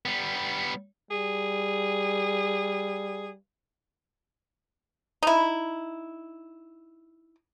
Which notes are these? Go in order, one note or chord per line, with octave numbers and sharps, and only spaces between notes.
G3 B3
G3 G#4
D#4 E4